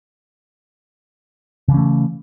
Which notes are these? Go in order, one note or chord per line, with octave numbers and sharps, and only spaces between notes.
C#3 E3 A3 C#4